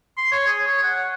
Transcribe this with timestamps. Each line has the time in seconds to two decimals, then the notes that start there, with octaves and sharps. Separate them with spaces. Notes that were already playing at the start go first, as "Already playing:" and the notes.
0.17 C6
0.32 C#5
0.47 G#4
0.67 C#5
0.83 F#5